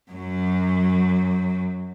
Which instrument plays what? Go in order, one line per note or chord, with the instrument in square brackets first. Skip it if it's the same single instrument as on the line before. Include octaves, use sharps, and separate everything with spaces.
[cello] F#2 F#3